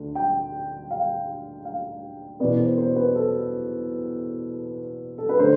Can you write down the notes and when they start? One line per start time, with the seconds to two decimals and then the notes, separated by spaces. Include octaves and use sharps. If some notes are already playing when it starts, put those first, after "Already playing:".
Already playing: D2 D3
0.15 G5
0.91 F5
1.65 F5
2.40 E2 B2 B3 D5
2.58 C5
2.78 C5
2.96 B4
3.15 A4
5.18 A4
5.29 B4
5.39 D3 A3 C5